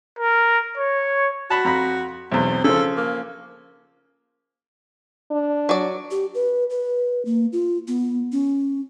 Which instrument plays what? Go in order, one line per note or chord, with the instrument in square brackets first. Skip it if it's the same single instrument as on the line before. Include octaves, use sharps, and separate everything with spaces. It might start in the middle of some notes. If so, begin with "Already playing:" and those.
[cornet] A#4
C#5
[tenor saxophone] F#4 [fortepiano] A5 B5
[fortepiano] F2 A#5 B5
[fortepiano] B1 E2 [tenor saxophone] C4
[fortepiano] C#3 F3 [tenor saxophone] A4
[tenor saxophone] A#3
[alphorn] D4
[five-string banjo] F#3 D5
[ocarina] G4
B4
B4
A#3
F4
B3
C#4